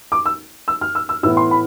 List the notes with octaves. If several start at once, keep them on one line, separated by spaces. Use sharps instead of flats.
D6
E6
E6
F6
E6
E6
A2 E3 B3 E4 E6
C6
B5